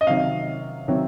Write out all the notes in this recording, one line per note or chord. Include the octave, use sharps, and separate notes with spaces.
D#5
C3 D#3 F#3 C4 F5
C3 D#3 F#3 C4